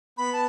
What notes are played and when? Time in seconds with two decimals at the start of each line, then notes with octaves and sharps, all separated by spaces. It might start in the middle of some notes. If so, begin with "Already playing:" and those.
0.18 B3 B5
0.33 A5